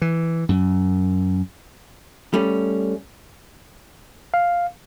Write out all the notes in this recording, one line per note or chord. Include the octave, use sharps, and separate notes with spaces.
E3
F#2
G3 A3 C#4
F5